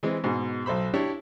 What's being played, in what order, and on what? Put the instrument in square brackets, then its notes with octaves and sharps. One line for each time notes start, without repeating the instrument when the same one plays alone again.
[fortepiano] E3 G#3 C4
G#2 B2
B1 A4 C5 B5
D4 E4 G4 C#5 D5